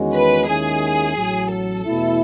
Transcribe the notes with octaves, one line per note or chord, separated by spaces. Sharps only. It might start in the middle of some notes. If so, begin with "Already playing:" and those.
Already playing: E2 D#3 G#3 C#4 F#4
B4
D#2 D#3 G#3 C#4 E4 G#4
A1 A2 F#3
A4
E2 B2 A3 E4